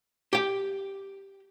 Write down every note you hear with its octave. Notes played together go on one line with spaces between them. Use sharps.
G4 G5